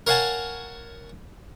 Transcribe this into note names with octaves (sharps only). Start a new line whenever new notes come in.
A#4 C#5 F5 F#5 G#5 A5